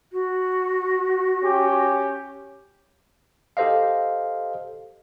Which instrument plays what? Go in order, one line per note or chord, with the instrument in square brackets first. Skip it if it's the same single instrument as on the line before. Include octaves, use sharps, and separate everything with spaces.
[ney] F#4
[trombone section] C#4 G4
[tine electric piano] G4 A4 C5 D#5 F5